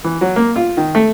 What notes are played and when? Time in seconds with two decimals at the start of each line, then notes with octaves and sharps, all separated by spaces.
0.04 E3
0.21 F#3
0.36 A#3
0.56 F4
0.77 D#3
0.95 A3